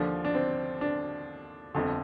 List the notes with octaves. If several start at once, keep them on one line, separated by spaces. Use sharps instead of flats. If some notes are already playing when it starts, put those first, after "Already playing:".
Already playing: D#2 D3 F3 D4
D4
C4
D4
G1 F2 D3